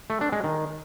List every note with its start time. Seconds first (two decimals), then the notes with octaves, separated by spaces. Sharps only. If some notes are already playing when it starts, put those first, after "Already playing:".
0.10 A3
0.21 D4
0.32 G#3
0.44 D#3